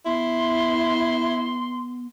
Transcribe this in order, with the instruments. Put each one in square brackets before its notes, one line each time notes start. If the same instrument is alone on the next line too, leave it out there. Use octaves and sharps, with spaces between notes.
[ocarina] B3 [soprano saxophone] E4 [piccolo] C6